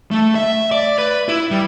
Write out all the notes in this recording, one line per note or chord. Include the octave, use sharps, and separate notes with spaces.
A3
E5
D5
B4
E4
G3